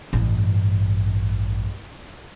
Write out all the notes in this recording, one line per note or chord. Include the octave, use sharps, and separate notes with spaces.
A1 G2